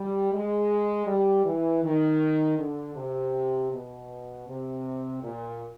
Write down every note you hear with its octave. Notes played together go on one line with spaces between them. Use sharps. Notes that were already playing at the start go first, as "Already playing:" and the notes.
Already playing: G3
G#3
G3
E3
D#3
D3
C3
B2
C3
A#2